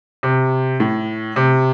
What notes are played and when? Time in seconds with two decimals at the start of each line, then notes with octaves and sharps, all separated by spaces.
0.23 C3
0.80 A2
1.36 C3